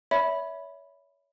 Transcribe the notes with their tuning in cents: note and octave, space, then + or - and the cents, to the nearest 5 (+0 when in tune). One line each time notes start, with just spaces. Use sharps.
C#5 +30 E5 -10 B5 +0